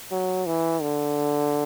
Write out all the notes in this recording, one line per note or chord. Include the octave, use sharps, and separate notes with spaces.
F#3
E3
D3